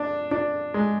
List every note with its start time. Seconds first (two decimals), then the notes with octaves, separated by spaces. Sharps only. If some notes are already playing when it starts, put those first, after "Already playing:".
Already playing: D4
0.31 D4
0.74 G#3